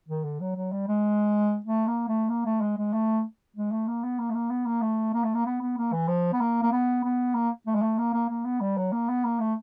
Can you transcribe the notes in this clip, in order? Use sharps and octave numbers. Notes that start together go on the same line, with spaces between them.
D#3
D3
F#3
F#3
G3
G#3
A3
A#3
A3
A#3
A3
G#3
G#3
A3
G#3
A3
A#3
B3
A#3
A3
A#3
B3
A#3
A3
A#3
A3
A#3
B3
B3
A#3
E3
F3
B3
A#3
A#3
B3
B3
A#3
A3
G#3
A3
A#3
A#3
A#3
B3
G3
F#3
A#3
B3
A#3
A3